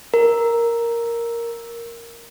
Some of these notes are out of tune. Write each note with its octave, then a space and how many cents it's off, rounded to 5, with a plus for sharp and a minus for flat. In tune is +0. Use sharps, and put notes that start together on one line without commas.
A#4 +0